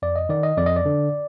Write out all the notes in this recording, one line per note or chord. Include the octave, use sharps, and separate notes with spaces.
F2 D5
D#5
D#3 D5
D#5
F2 D5
D#5
D5
D3